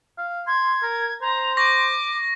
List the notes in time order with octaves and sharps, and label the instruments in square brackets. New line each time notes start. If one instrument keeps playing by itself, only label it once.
[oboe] F5
[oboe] C6 [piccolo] G#6
[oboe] A#4
[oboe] C5 [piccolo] A#5
[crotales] C#6 A#6 [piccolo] D6